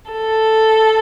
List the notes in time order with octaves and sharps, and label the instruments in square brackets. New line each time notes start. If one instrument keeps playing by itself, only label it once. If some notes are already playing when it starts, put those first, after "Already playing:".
[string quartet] A4